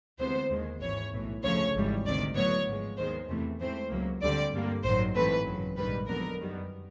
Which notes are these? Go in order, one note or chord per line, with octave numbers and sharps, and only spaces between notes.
D2 C3 E3 G#3 B3 C5
D#2 D#3 G#3
G#1 G#2 E3 C#5
B1 A2 E3
D2 C#3 F3 A3 C#5
G#1 G#2 E3 G3
D2 C3 D#3 D5
A2 F#3 B3 C#5
G#1 G#2 F3 G#3
D#2 D#3 G#3 B3 C5
E2 C3 E3 A3
G#2 E3 A3 C4 C5
C#2 C#3 F#3 A#3
D2 D3 G3 C4 D5
G2 D3 G3 A#3
A1 G2 D#3 F#3 C5
G#2 E3 A3 C4 B4
G#1 F#2 C#3 F#3
A#1 G#2 D#3 G3 B4
F2 D3 F#3 B3 A#4
F#2 D#3 G3 B3